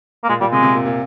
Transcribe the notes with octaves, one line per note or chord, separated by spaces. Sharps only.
A#3
A#2 G#3
A#2 G3
C3 G#3
C3
A#2
A#2